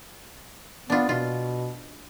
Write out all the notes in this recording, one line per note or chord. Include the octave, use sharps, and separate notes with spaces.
B3 D4 F4
B2 F4